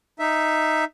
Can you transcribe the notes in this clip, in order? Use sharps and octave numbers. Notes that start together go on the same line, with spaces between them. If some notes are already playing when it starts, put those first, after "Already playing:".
D#4 E5